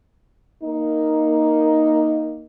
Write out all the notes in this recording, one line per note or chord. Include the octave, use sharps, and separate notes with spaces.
A#3 D#4